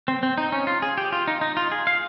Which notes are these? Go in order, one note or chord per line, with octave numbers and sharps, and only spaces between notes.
C4
C4
D#4
C#4
F4
G#4
G4
F4
D#4
D#4
F4
G#4
F5